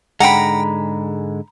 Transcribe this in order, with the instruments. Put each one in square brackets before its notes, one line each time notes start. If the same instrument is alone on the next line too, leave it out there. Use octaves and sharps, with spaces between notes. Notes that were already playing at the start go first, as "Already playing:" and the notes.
[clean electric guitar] G#2 D3 G#3 [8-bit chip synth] F#5 G5 [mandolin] A#5 B5